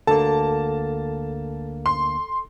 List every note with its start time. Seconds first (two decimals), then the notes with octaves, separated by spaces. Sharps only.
0.07 D2 D3 A#3 A4 A5
1.86 C6